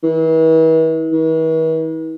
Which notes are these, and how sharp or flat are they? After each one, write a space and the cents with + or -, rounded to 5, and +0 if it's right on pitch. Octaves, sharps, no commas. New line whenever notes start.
E3 -40
E3 -45